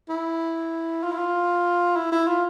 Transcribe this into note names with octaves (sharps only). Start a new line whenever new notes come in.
E4
F4
E4
F4
E4
E4
F4